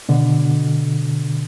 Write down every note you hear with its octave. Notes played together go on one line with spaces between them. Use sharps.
B2 D3